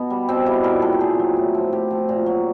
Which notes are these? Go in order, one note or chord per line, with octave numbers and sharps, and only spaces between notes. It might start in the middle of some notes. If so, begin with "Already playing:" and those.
Already playing: B2 B3
G3
B2 C4
G3 E4
A#2 A#4
F#3 A4
G4
A#2 G#4
F#3
A2
F3
A2 G4
F3
A#2
F#3